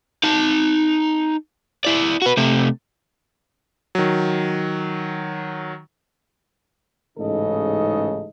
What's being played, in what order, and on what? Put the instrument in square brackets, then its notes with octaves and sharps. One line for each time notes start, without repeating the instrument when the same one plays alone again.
[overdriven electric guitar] D#4 A5
E4 D5
F#4 B4
C3 A3
[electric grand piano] D#3 F#3
[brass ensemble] A1 G#2 C#3 D#4 A4 D#5